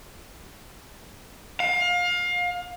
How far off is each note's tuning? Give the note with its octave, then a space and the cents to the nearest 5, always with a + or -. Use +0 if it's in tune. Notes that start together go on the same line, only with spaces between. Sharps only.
F5 +25